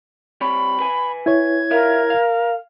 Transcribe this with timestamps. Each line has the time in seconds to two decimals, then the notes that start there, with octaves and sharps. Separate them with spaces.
0.41 G3 C4 C#5 B5
0.80 B4 G#5
1.26 E4 C#5 G#6
1.71 F4 A#4 E5 F5
2.10 F5